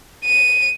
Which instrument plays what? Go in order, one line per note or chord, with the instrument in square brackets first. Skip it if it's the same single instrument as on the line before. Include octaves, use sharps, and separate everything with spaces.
[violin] D#7